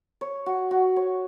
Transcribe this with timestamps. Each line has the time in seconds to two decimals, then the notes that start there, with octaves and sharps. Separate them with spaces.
0.21 C#5
0.46 F#4
0.71 F#4
0.96 C#5